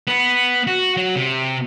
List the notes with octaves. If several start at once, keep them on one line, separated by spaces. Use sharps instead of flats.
B3
F#4
F#3
C3